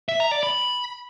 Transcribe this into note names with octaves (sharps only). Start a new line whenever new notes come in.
E5
A#5
D5
B5